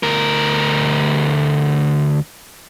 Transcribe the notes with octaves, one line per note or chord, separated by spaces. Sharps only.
D2 A#4